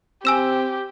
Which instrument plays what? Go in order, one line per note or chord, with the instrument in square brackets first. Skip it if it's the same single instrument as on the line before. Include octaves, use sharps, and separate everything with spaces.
[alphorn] C4 [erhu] G4 [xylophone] G#5 E6 E7